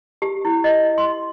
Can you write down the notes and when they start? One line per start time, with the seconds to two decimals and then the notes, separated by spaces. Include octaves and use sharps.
0.22 G4
0.45 E4
0.64 D#5
0.98 C6